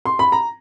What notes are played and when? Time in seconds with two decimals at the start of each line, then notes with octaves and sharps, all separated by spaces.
0.05 C6
0.19 B5
0.32 A#5